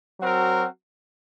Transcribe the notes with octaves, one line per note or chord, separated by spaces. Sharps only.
F#3 C4 F#4 A#4